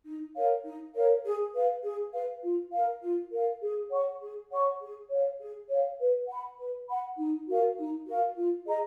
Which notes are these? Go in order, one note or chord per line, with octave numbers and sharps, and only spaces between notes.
D#4
A#4 C#5 F5
D#4
A#4 C#5 F5
G#4
B4 F5
G#4
B4 F5
F4
A#4 F5
F4
A#4 F5
G#4
C#5 F#5 C#6
G#4
C#5 F#5 C#6
G#4
C#5 F5
G#4
C#5 F5
B4
F#5 B5
B4
F#5 B5
D#4
F#4 A#4 F5
D#4
F#4 A#4 F5
F4
G#4 D#5 A#5